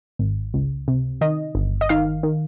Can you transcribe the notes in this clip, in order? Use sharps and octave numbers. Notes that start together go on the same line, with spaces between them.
G#1
C#2
C3
D#3 D#5
G1
D#5
D#3 F5
D#3